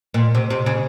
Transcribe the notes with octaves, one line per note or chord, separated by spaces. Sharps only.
A#2
C3
C3
C#3